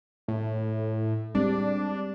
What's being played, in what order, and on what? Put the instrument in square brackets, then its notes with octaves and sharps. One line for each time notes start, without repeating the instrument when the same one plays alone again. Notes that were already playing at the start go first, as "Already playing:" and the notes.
[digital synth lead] A2
[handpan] G3 G#3 C4 [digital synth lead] D4